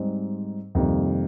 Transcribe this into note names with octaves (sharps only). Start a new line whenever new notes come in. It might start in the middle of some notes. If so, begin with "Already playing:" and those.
Already playing: G#2 G3 C4 D#4
F2 C3 D#3 G3 A#3